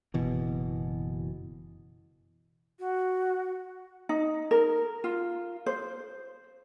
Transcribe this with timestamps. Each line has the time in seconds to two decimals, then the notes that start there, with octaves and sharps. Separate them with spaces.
0.14 F#1 B2 E3
2.79 F#4
4.09 D#4
4.51 A#4
5.04 F4
5.66 C5